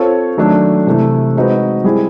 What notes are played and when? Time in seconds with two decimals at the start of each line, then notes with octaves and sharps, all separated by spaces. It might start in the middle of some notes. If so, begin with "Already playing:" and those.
Already playing: C4 F4 A4 C#5
0.37 D#3 F#3 A3 D4
0.87 C3 E3 A3
1.36 G#3 C4 D#4 F#4 B4
1.84 G3 C4 E4 G#4